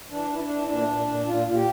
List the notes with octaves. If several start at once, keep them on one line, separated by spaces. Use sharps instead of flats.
E3 D4
E3 E4
D4
E3
A#2 D4
A#2
A#2
A#2 F4
A#2 F4
G4